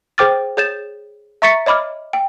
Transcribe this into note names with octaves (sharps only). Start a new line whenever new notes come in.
G#4 C5 G5 D6 F6 A6
G#4 C#5 G6 A6 E7
E5 A#5 C#6 A6 B6 C#7
C#5 D#5 B5 D6 F6
G5